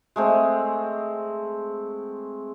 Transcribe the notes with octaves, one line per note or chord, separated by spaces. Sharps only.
G#3 A3 C4